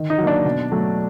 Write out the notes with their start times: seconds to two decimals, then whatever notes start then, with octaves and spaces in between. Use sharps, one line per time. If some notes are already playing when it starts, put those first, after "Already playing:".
Already playing: D#3
0.10 D#4
0.18 F#3
0.24 A#3 D4
0.45 B2
0.72 F#3 A3